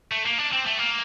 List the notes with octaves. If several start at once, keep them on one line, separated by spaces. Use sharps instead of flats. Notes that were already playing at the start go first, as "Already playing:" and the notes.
A3
A#3
D4
C4
A3
A#3